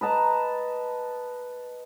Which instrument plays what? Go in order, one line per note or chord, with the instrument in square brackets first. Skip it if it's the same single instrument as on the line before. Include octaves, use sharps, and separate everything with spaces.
[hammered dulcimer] B4 D#5 A5 A#5